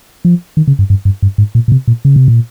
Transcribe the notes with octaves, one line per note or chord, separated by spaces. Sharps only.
F3
D#3
C#3
G2
G2
G2
G2
G#2
A#2
A#2
C3
A#2
C#3
C3
A#2